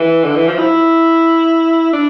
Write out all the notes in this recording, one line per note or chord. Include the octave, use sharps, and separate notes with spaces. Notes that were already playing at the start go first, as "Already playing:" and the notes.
Already playing: E3
D3
E3
F3
E4
D4